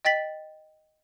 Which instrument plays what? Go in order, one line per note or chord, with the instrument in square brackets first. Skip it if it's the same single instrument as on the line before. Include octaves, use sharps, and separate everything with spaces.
[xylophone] D#5 G5 A6 B6 F#7